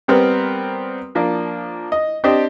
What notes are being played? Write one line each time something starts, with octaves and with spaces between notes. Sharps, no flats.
G3 B3 C4 A#4 B4
F3 A#3 D4
D#5
C4 D4 G4 C5 D#5